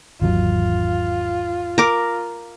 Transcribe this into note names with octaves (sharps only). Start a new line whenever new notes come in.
G#1 E2 F#3 F4
A#4 D6